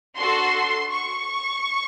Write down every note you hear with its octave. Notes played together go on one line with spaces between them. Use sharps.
D4 F#4 A4 C6
C#6